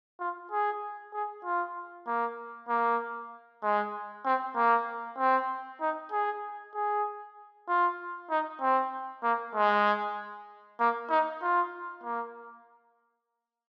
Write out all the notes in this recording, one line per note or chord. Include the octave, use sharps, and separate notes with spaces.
F4
G#4
G#4
F4
A#3
A#3
G#3
C4
A#3
C4
D#4
G#4
G#4
F4
D#4
C4
A#3
G#3
A#3
D#4
F4
A#3